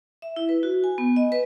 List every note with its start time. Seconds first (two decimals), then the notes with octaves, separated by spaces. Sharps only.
0.22 E5
0.36 E4
0.49 B4
0.63 F#4
0.84 G#5
0.98 B3
1.16 D#5
1.32 B4